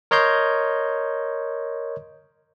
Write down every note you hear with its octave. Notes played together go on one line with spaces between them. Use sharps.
A#4 C#5 D#5 C6 G6